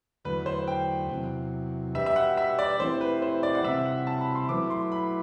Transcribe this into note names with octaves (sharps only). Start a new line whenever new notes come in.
E2 D3 F#3 A3 B4
C5
G5
E2 C3 F#3
G3 D4 G4 B4 E5
E5
F#5
E5
D5
E3 A3 C4 E4 G4 C5
B4
C5
D5
F#5
C3 E3 G3 C4 E5
F#5
A5
B5
C6
F#3 A3 E4 B4 D6
C6
B5